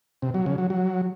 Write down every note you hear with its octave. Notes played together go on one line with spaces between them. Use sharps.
C3
F#3
C#3
F#3
F#3